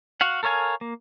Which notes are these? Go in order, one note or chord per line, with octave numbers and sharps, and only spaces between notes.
F#4 F5 F#5
A4 A#4 C#5 F5 G#5
A#3